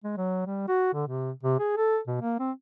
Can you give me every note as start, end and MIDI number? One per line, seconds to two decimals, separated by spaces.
0.04 0.13 56
0.17 0.46 54
0.46 0.65 55
0.68 0.94 66
0.94 1.06 50
1.07 1.31 48
1.43 1.57 48
1.59 1.75 68
1.77 1.99 69
2.07 2.17 47
2.22 2.36 58
2.40 2.52 60